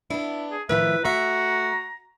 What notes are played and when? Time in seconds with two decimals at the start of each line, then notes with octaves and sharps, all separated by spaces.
0.10 B3 D4 E4
0.52 G#4
0.69 A2 D#3 F3 B4 E5
1.05 A3 F#4 E5 A#5